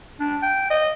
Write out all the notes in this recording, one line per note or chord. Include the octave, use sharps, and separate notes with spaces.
D4
G5
D#5